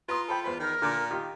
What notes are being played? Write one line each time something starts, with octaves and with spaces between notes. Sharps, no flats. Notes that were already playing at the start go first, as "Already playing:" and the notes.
F4 B4 A#5 C6 D#6
A4 C5 G5 B5
E2 B4 C5 B5
D#3 A#4
A#2 D3 D6
D#3 F4 G4